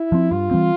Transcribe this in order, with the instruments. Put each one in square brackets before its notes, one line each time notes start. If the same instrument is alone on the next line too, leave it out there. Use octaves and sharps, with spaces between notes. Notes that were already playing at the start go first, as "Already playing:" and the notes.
Already playing: [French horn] E4
[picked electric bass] F3 C4
[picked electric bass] G2 [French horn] F4
[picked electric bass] E3 G3 C4